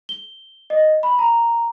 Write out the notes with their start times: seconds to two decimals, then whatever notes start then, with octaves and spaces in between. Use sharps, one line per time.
0.09 G7
0.70 D#5
1.03 B5
1.19 A#5